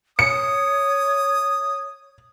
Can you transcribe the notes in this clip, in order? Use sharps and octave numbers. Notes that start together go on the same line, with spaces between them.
C#5 D#6 C#7